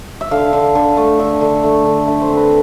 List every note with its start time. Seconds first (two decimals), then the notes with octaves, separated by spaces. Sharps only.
0.21 E5
0.31 D3 F5
0.53 D3
0.75 D3
0.97 A3
1.19 D3 E5
1.41 D3
1.63 A3
1.85 D3
2.07 D3 E5
2.22 C5
2.29 C4
2.37 B4